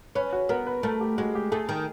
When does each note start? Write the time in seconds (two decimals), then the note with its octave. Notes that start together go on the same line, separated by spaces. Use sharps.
0.15 C#4 B4
0.33 F#4
0.49 B3 A#4
0.67 B4
0.83 A3 A#4
1.01 G4
1.18 G#3 F#4
1.35 G4
1.52 A3 G#4
1.69 D#3